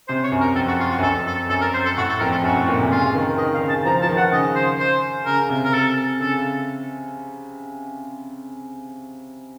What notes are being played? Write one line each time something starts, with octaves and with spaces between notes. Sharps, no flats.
C3 C5
C#5
F#2
A#4
F2 A4
F#4
F4
F#4
F#2
F2 A4
A4
F#2 A4
A#4
C5
A4
A2 F#4
A4
F2 A#4
A4
F#2 F#4
A2
A#2
C3
C#3 F4
D#3
D#3 D#5
F5
C#3
A5
F3 A#5
F3 A5
D#3
F#5
C#3 D#5
C5
C5
C#3 A#4
C3
A#4
A4
C#3 A4